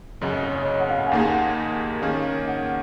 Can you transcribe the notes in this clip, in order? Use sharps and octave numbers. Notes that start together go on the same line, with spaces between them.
F#2 C#3 F#3 D#5
D#5
C#5
C#5
F#5
F5
G#5
D#2 D#3 A#3 D#4 G#4 F#5
D#3 A#3 C#4 G#4 F5
F#5